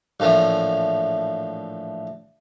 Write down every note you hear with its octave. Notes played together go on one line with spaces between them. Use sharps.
A#1 A2 E3 F3